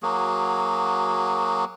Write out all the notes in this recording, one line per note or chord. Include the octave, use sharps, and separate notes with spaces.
F#3 A#3 F#4 G#4